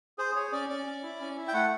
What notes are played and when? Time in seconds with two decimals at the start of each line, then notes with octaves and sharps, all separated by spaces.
0.18 G#4 C5
0.35 G#4 C#5
0.52 C#4 D5
0.69 C#4 D5
0.86 C#4
1.03 E4
1.20 C#4
1.37 E4
1.48 G5
1.53 A3 F#5